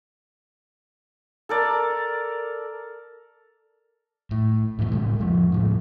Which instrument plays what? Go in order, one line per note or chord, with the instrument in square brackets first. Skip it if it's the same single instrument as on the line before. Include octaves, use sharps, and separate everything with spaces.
[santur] A4 A#4 D5
[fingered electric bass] A2
G#2 B2 D3 E3
A2 C#3 G#3
F2 F3 G#3
A2 C#3 F3